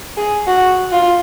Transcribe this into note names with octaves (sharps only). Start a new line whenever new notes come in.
G#4
F#4
F4